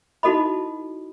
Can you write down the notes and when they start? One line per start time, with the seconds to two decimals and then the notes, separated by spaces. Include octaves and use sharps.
0.23 D#4 E4 F#4 A4 D#5 B5